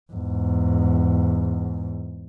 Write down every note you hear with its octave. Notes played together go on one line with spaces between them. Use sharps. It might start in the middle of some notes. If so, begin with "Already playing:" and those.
E2 G#2